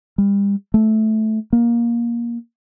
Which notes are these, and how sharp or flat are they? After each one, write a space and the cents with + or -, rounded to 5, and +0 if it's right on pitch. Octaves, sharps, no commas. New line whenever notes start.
G3 +35
A3 -10
A#3 +15